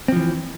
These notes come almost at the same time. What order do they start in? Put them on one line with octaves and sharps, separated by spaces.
C4 F3 E3